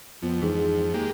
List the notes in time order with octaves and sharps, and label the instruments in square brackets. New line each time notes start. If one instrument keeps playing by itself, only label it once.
[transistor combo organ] F2 [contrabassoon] F3 [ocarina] B3
[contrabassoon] G#2 [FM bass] E3 [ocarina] G#4
[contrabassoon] D#2 [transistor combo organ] G#3 A#3 G4